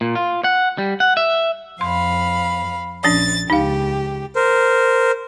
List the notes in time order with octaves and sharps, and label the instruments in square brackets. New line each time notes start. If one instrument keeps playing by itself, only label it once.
[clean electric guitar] A#2
F4
F#5
G3
F#5
E5
[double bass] F2 [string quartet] F5 B5 [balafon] C6
[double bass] A#1 [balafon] F3 C#4 D4 [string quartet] A6
[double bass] C#2 [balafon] D#4 F5 [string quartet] G4
[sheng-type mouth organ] A#4 C5